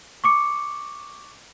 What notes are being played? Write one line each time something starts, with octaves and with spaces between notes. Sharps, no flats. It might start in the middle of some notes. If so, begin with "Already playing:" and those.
C#6 D6 C#7